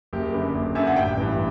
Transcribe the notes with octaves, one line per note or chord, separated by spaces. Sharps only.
F#1 G4
F#2 D3 B4
F#1
F#2 D3 E5
F#5
A1 G5
G2 E3